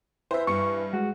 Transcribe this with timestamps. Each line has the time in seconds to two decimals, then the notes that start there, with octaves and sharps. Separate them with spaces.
0.31 E3 C5 E5
0.47 G2 C#6 C#7
0.93 G#3 F#4